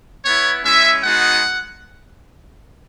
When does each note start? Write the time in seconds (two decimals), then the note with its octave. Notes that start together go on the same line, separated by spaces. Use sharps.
0.25 B3 E4 C#5
0.63 G#3 C#4 E4 E5
1.03 G#3 B3 D#4 F#4 F#5